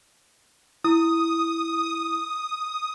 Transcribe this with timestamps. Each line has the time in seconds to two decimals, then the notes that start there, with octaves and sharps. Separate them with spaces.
0.84 E4 D#6
1.83 D#6